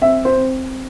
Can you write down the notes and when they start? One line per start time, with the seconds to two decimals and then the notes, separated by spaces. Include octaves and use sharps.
0.01 C4 E5
0.25 C5
0.37 C4